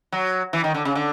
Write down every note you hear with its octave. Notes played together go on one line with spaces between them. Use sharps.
F#3
E3
D#3
D3
C#3
D3